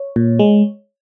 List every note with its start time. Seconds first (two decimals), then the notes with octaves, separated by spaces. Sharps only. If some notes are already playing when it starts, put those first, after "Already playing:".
Already playing: C#5
0.16 A#2
0.39 G#3